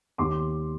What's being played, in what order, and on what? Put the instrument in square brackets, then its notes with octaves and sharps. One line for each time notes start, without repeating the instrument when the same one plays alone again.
[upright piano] D#2 C6 D6